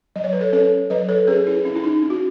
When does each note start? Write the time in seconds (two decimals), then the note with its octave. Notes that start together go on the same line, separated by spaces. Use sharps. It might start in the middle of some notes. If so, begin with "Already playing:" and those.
0.16 F#3 D#5
0.24 C#5
0.33 B4
0.41 A4 C#5
0.53 C#4 A4 C#5
0.90 F#3 B4 D#5
1.09 A4 C#5
1.27 C#4 G#4 B4
1.47 E4 G#4
1.64 C#4 E4
1.76 E4
1.84 D#4
2.02 C#4
2.10 F#4